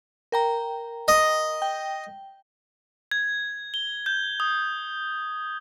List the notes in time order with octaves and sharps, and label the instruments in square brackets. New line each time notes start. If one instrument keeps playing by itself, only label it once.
[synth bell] A#4 G5 A#5
[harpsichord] D#5
[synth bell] G5
[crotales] G#6
G7
G6
D#6